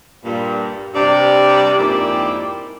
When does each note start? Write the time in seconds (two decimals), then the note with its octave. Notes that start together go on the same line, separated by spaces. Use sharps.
0.24 G2 A#2
0.94 G2 C3 D5
1.78 F2 G#2 A#3 E4 G4 D5